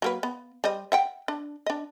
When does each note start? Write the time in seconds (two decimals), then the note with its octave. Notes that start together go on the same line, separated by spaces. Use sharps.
0.02 F#3 A#3 B4
0.23 B3
0.64 G3 C5 D#5
0.92 E5 F#5 G5
1.28 D4
1.66 D4 D#5